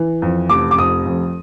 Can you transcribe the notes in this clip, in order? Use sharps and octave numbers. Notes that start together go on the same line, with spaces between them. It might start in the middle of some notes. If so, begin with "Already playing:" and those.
Already playing: E3
F2
F1 D6
D6
F2 D#6
F2